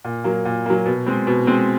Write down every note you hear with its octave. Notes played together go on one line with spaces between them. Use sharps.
A#2
F#3 A#3
A#2
F#3 A#3
B2
G#3 C4
B2
G#3 C4